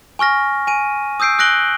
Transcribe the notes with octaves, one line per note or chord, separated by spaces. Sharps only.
G#5 C#6 F6 A#6
G#5 D#7
D#6 E6 G6 C7 D7
D#6 F#6 A#6 D7 F#7 G7